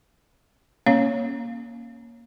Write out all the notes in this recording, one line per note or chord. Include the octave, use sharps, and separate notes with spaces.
A#3 C#4 C#5 F5